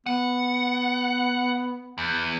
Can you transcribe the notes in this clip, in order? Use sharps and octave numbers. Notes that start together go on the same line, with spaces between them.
B3 F#5
E2